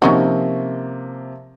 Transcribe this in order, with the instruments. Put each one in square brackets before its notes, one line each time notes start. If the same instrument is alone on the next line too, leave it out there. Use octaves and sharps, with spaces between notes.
[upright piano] C3 F3 A#3 [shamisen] C#4 D#4 F#4